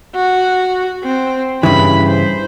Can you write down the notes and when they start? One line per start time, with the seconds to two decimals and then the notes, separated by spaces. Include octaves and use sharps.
0.15 F#4
1.03 C4
1.63 G2 C#3 E3 B5
2.06 C5